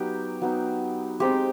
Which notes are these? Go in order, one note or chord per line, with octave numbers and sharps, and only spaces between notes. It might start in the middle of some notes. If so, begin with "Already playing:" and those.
Already playing: F#3 B3 D#4 G4
F#3 B3 D#4
G#3 C4 D#4 G4